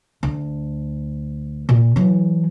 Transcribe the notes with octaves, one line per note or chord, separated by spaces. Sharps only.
D2
A#2
E3 F#3